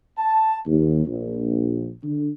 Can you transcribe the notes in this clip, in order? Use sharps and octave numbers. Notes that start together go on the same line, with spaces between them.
A5
D#2
A#1
D3